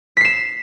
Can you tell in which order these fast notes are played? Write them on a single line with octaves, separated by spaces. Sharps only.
B6 C7 E7